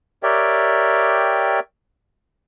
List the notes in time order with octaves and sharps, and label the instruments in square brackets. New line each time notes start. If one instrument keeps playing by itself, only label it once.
[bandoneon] G4 A#4 C#5 D5 E5 G5